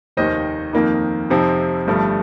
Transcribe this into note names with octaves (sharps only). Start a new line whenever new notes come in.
F1 D#2 D#3 A#3 C5 D#5
F2 D#3 A#3 D#4
F2 C3 F3 C4 D#4
G1 G2 F3 A3